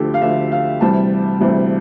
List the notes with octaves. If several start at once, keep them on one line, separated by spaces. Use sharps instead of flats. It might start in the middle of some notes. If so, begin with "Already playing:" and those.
Already playing: D2 D3 F3 G4 A4
F5
D2 D3 F3 E5
F5
D2 C3 E3 G3 A5
D2 C3 E3 G3